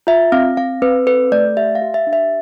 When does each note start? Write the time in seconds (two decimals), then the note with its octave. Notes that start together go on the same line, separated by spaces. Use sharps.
0.07 F4 E5
0.32 C4 F5
0.57 C4 F5
0.82 C4 B4
1.07 A4 B4
1.32 A3 D5
1.57 G4 E5
1.75 F5
1.82 G4
1.94 E5
2.07 D4
2.13 E5